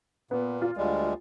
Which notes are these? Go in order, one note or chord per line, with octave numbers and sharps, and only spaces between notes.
A#2 B3
F4
D2 G3 G#3